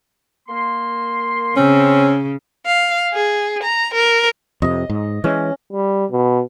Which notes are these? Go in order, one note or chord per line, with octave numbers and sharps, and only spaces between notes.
A#3 C6
C#3 C4 C#4
F5
G#4
A#5
A#4
F2 C3 D#5
G#2
E3 G#3 C#4
G3
B2